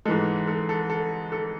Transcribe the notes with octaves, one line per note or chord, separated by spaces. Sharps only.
G#2 E3 G#3 A4
A4
A4
A4
A4